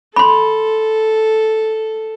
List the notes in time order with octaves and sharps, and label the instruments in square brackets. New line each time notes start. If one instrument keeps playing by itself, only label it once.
[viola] A4 [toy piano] B5 C6